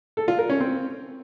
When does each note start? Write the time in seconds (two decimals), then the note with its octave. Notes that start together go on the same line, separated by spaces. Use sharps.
0.17 A4
0.28 F4
0.39 A#4
0.50 C#4
0.60 C4